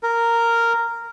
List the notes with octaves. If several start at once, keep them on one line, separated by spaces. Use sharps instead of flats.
A#4